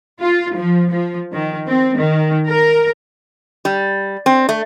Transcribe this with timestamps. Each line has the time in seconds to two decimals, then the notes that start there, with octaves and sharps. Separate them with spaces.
0.21 F4
0.55 F3
0.90 F3
1.33 D#3
1.68 C4
1.97 D#3
2.48 A#4
3.65 G3
4.26 C4
4.49 A3